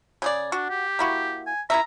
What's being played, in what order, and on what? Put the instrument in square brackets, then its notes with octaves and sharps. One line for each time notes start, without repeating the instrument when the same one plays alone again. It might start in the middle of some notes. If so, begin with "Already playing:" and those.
[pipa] C#3 G#4 D5
[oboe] D4 [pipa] F#4
[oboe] G4
[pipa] A#3 E4 F#4
[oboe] G#5
[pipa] E4 A#4 E5 [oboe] A#5